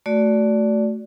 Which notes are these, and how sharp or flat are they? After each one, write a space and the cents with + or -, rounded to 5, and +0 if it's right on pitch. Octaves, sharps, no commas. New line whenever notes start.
A3 +0 F#4 +10 D5 -15